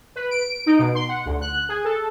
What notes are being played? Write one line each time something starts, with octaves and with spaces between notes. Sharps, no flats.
B4
D7
D#4
B2
C6
F#5
D2
F#6
G#4
A4